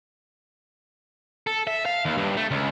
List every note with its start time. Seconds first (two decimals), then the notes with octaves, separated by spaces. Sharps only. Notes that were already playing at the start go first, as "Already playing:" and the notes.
1.47 A4
1.67 E5
1.86 F5
2.05 D#2
2.18 G2
2.37 A3
2.51 C#2